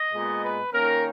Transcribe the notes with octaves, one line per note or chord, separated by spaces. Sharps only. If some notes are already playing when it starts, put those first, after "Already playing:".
Already playing: D#5
A#2 G#3 B3
B4
D#3 A#3 C#4 A#4